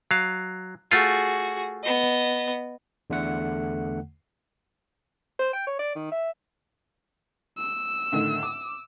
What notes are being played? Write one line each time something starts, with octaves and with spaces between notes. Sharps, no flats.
F#3 F5
A3 F4 F#4 G#4
B3 D#5
E2 D3 A3 F#5
C5
G5
C#5
D5
D#3
E5
E6
A2 D3 D#3
D6